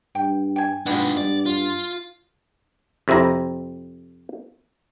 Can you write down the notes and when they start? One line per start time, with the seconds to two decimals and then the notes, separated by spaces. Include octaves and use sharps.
0.15 G2 G5
0.56 G5 G#5
0.86 G#2 G3 G#3 B3 D4 F4
1.17 G2 D5
1.46 F4
3.08 F2 C3 C4 E4 A#5